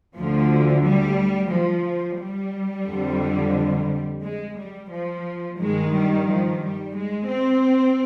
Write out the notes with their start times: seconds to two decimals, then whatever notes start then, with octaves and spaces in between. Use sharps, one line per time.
0.15 D2 D3 F3
0.84 G3
1.51 F3
2.20 G3
2.87 F2 D3
4.23 G#3
4.57 G3
4.91 F3
5.59 G2 D#3 G#3
5.94 G3
6.28 F3
6.62 G3
6.95 G#3
7.30 C4